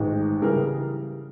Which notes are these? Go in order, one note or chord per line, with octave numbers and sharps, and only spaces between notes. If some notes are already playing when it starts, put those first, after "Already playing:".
Already playing: A1 G#2 D#3 G#3
C#3 E3 G3 G#4 A#4